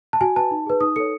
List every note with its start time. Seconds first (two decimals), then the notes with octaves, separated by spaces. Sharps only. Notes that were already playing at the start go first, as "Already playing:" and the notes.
0.13 A5
0.21 F#4 G#5
0.36 B4 A5
0.51 D#4
0.66 G#4 B4
0.81 D#4 D#6
0.96 A4 C#5 C#7